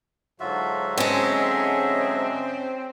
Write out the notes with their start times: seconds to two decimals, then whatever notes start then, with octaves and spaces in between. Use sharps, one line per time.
0.40 G#2 D3 F#3 F4 F#4 E5
0.98 G#3 C4 C#4 G#4 D#5 E5